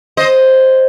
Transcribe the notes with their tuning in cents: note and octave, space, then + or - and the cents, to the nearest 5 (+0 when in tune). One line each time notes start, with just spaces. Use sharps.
C5 +0 D#5 +0